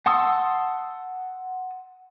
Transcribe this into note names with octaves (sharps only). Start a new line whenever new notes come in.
F#5 A5 C6 D#6 E6